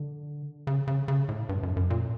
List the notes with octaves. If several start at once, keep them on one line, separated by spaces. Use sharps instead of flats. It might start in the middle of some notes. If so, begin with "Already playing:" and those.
Already playing: D3
C#3
C#3
C#3
A2
G2
F#2
F#2
A#2